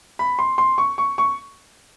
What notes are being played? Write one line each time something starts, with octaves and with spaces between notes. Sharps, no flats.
B5
C6
C6
C#6
C#6
C#6